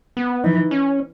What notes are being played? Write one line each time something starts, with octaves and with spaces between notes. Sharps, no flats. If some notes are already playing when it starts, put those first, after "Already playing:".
B3
E3 D#4
C#4